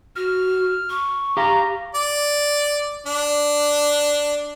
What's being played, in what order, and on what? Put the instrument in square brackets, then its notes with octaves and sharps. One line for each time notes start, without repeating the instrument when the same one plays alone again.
[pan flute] F#4 [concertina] F6
[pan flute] C#6
[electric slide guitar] G4 F5 [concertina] A#5
[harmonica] D5
D4